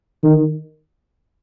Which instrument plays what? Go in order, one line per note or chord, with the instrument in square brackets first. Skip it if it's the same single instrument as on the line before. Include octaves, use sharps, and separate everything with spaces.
[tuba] D#3